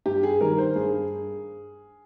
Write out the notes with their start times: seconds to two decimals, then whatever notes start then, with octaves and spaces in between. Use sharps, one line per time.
0.06 G2 G4
0.23 G#4
0.40 D#3 G3 A#4
0.58 C5
0.75 G2 G#4